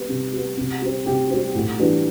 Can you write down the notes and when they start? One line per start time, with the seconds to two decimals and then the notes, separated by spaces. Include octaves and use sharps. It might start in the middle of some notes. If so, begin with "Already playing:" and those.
Already playing: G3 B3
0.08 C3
0.33 G3 B3
0.57 C3
0.82 G3 C4
1.06 C3 G4
1.30 G3 C4
1.55 A2
1.79 E3 G3 B3 D4